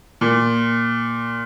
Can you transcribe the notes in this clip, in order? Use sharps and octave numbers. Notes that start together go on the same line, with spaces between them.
A#2